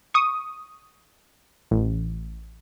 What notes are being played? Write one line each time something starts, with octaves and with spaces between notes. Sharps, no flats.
C#6 D#6
A1